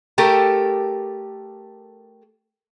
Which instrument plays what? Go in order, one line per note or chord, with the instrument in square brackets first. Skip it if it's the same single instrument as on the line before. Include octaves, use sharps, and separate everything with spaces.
[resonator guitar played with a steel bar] A3 G4 A4 A#4